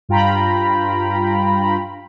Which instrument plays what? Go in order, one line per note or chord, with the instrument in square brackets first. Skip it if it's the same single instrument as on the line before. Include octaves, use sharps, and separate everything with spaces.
[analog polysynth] G2 F4 G5 A#5 B5